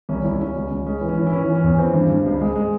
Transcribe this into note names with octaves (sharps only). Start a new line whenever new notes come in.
C2 C#4
C2 E4
C#2 C#4
C#2
C#2
G#3 C#4
E3
C#4
E3
E4
E3 C#4
E3
C#4
E2
E3 C4
G2
G2
C#2
G#3
G#3